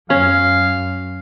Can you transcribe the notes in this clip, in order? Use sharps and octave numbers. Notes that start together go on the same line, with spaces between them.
F#2 C#4 F5